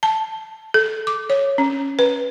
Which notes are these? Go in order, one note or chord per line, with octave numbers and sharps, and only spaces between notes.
A5
A4
D6
C#5
C#4
B4